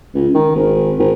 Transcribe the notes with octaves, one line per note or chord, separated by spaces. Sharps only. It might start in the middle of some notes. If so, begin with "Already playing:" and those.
C#2
D#3
G#1
G#1